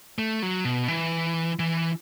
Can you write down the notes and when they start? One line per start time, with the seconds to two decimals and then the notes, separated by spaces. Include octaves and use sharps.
0.18 A3
0.43 F#3
0.65 B2
0.88 E3
1.59 E3